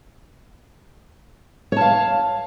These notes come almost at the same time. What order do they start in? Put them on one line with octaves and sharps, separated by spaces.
C#5 A5 F5